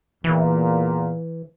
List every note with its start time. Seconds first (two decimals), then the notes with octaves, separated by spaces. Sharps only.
0.24 E2 A#2 E3